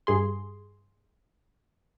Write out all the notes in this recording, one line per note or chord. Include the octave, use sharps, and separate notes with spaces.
G2 G#4 C6